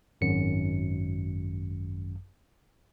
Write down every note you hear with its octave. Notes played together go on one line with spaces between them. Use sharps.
G#1 F#2 C#7